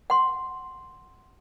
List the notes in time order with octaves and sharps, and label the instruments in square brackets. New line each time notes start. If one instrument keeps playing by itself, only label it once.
[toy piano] F#5 C6